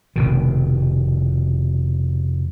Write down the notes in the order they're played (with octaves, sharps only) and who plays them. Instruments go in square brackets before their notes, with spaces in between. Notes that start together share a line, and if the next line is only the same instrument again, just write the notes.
[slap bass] F1 B2 D#3